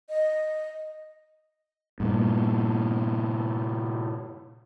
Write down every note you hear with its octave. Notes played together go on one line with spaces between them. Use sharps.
D#5
G2 A#2